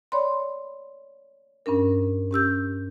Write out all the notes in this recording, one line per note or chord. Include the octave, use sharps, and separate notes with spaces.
C#5 D5 B5 C6
G2 C#4 D4 A#4
C#4 G4 E6 G6